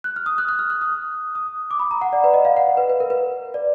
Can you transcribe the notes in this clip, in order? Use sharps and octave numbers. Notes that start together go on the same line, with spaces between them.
F#6
F6
D#6
F#6
F#6
F6
F#6
D#6
D#6
D6
B5
A#5
F#5
D5
B4
D#5
F5
F#5
B4
B4
A#4
B4
D5